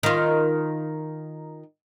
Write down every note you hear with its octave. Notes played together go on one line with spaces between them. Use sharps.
D#3 F4